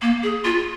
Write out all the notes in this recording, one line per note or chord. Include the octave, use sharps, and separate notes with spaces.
A#3
G#4
F4